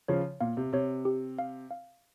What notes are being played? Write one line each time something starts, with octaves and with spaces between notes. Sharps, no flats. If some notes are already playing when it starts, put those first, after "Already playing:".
C#3 F3 C#5
A#2 F5
C3
C3 C#5
G4
F5
F5